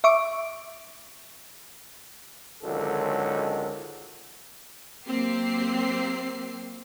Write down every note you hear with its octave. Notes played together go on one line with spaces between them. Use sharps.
E5 C#6 D6 D7
G#1 C#2 D3 D#3 F#3 A4
F#3 A#3 C4 G4 C7